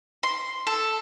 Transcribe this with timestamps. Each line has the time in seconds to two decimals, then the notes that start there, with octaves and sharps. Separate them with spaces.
0.23 C6
0.67 A4